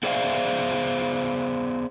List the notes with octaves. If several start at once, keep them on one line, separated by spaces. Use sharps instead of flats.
B3 G#4 C5 D5 E5 F5